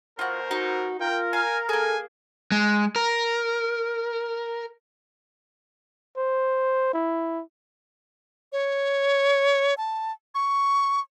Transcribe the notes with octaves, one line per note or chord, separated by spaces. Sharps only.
B2 F4 F#4 A#4 C5
D#4 F#4
F4 A#4 G5
F5 G#5
A#3 G#4 A4 G#5
G#3
A#4
C5
E4
C#5
A5
C#6